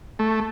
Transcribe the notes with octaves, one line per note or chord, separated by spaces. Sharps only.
A3